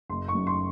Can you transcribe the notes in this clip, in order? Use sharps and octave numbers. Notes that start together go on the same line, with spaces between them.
F#1 C6
C#6
F#2
C6